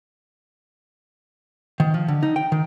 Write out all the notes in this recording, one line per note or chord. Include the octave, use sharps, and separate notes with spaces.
D#3
F3
D3
D#4
G5
D#3